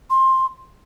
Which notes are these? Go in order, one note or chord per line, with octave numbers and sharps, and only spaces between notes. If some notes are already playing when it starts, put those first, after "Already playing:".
C6